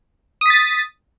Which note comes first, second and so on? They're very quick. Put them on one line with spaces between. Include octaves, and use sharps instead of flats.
D#6 B6 A6